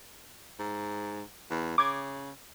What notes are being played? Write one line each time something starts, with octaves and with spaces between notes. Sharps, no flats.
G#2
E2
C#3 D6 G#6